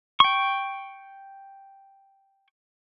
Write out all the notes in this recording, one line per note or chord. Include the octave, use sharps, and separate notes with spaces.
G5 C#6